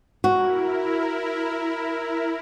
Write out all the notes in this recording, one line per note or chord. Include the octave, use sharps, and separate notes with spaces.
E4 F#4 A#4